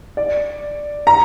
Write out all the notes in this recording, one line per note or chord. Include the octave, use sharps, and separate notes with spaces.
D5
A#5